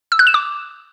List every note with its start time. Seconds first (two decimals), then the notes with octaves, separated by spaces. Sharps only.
0.12 E6
0.19 F#6
0.27 E7
0.34 D6